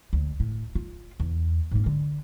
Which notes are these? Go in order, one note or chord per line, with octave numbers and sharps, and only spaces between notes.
D2
A2
F4
E2
G#2 A#3
D3